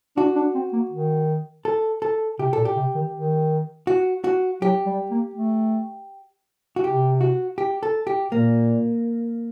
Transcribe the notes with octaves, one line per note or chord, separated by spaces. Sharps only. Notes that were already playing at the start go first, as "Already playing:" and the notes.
D4 F#4
D4
C4
A#3
D#3
A4
A4
C3 G4
A#2 A4
G4
C3
D#3
D#3
F#4
F#4
F#3 G4
G3
A#3
A3
F#4
C3 G4
F#4
G4
A4
G4
A#2 A#3